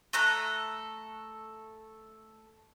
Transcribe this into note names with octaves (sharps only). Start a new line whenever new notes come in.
A3 A4 A#5 F#6